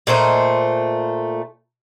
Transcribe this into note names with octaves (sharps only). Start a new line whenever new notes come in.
A#2 A3 C5 D#5